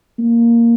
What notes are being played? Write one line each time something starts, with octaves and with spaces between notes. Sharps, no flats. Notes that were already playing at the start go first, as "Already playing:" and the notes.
A#3